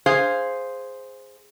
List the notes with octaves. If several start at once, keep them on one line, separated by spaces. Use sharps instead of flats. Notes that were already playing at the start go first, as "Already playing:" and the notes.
G#4 C5 F5